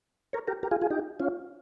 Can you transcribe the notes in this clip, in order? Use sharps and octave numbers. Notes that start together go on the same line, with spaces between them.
A#4 C#5
G4 A#4
G4 A#4
F4 G#4
F4 G#4
D#4 G4
C#4 F4